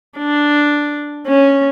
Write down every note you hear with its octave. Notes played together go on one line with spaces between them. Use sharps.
D4
C#4